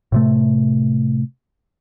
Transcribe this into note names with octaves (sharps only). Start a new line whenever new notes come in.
A2 C3 A3